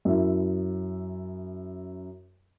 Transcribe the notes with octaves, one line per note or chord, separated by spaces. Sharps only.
F#2 E4 E5